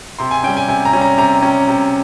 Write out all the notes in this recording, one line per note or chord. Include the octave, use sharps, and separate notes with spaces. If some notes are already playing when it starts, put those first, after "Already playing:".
C3 C6
G#5
G3 C#4 G5
G#5
C3 G#5
A#5
G3 C#4
A#5
C3 A#5
G3 C#4
C3